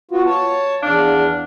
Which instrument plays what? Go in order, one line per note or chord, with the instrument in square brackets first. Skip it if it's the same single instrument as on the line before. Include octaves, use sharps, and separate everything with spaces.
[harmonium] B3 F4 F#4
C#5 A5
[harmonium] E2 F5 [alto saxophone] D4